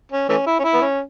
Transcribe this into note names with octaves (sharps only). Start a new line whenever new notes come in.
C#4
E3 A3 C#4
E4
C#4
E4
B3
C#4